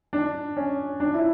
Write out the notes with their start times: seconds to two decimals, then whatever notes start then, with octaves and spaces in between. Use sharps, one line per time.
0.13 D4
0.57 C#4
1.00 D4
1.14 E4